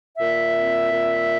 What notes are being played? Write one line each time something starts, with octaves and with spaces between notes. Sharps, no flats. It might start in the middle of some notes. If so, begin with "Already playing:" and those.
A#2 E5
C4
A#2